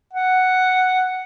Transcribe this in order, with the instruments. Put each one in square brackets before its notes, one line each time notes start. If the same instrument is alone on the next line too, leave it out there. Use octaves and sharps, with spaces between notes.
[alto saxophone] F#5